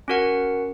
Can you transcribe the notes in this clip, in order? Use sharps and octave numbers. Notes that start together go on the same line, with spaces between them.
C#4 F#4 A#4 F#5